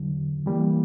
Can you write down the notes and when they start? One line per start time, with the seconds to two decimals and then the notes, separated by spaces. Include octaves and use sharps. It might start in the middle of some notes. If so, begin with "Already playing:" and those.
Already playing: E2 D3 F#3
0.46 E3 G3 A#3